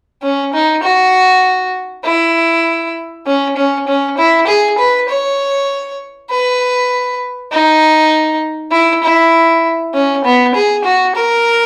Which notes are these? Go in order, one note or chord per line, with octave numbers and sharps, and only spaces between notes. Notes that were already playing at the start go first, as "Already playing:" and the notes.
C#4
D#4
F#4
E4
C#4
C#4
C#4
E4
G#4
B4
C#5
B4
D#4
E4
E4
C#4
B3
G#4
F#4
A#4